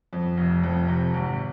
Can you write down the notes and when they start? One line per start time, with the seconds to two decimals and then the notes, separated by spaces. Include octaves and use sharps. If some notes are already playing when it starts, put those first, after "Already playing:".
0.13 F2
0.37 F1
0.63 F2
0.88 C3
1.14 G#1